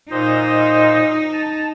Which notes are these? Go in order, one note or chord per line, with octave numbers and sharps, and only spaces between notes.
A#2 D#4 C5 D#5
A5